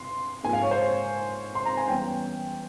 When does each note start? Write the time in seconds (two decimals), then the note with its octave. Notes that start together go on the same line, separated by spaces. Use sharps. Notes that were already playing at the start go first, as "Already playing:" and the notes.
Already playing: C6
0.44 G#2 F3 A#3 G#5
0.53 F5
0.63 C#5
0.71 C5
1.55 C6
1.65 A#5
1.77 G#5
1.88 E2 E3 G3 C#4 G5